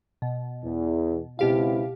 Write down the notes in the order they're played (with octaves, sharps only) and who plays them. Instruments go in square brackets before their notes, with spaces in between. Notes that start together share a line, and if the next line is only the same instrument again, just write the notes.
[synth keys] B2
[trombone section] E2
[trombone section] C#2 C4 E4 [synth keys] B2 G4 F5